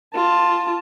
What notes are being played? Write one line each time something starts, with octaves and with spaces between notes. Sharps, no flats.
F4 A5